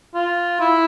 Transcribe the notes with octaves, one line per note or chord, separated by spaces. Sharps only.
F4
E4